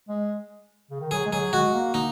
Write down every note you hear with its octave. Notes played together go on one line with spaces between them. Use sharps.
G#3
C#3
D#3
F#3 G#4
G#3
F#3 G#4
G#3 F#4
A#3
A#3 D#4